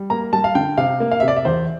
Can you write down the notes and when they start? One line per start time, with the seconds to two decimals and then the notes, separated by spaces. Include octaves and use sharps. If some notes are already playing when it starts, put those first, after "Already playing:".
Already playing: G3
0.10 A#3 A#5
0.33 G3 A5
0.44 F5
0.55 D3 G5
0.78 C3 F5
1.00 A#3
1.12 F5
1.20 C3 E5
1.28 D5
1.36 E5
1.45 E2 C5